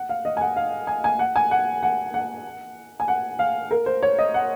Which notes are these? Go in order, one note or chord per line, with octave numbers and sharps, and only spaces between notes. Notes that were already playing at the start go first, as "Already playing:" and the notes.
Already playing: F#5
F5
D#5
G#5
F#5
F5
G#5
G#5
F#5
G#5
F#5
F#5
F#5
G#5
F#5
F5
A#4
C5
C#5
D#5
F#5